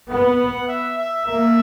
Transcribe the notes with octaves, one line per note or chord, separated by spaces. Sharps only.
B3 F#5
E5
E5
A#3 E5